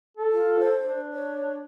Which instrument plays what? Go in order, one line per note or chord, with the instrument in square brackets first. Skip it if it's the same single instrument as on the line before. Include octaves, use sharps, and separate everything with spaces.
[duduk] A4
[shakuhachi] F4
C5
[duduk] D4
[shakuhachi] C#5